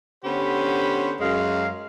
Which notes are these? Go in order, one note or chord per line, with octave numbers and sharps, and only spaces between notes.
D3 B3 C#4 G4 C5 B5
F#2 G#3 F5